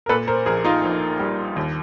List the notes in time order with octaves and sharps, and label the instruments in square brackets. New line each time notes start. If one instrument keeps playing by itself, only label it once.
[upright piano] A#4
A#2 A4 B4
A#4 C5
A#1 G#4 A#4
D#4 F4
A#1
G3
D#2